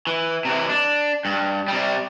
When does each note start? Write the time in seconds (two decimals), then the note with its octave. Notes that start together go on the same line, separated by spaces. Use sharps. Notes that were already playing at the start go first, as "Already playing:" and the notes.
0.07 E3
0.45 C3 E3
0.69 D4
1.25 G2
1.68 C3 G3